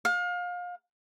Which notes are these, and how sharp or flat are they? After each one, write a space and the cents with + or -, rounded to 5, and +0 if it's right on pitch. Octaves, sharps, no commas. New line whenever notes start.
F5 +30